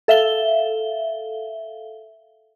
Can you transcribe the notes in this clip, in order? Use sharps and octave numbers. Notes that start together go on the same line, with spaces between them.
A4 E5 F5 G7